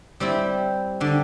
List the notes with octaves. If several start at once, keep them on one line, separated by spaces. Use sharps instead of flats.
G3 C4 E4
D3 G3